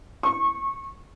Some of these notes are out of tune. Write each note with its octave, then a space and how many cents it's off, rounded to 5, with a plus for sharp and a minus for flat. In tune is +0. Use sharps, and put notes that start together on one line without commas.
C#6 -25